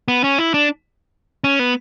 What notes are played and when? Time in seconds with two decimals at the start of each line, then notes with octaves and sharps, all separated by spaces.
0.08 B3
0.24 C#4
0.39 E4
0.54 D4
1.44 C#4
1.59 B3